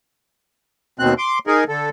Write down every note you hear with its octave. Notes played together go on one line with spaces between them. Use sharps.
D#2 B2 C4 F#6
C6 D6
D#4 G#4 A#4
D3 A4